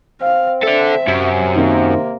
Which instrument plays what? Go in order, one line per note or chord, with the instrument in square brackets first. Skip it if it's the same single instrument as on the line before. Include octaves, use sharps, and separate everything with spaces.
[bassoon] C4 [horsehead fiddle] F5
[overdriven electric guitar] A4 D5 [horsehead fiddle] E5
[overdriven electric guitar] F#2 [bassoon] C3
[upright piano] D#3 C4 [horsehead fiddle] A#3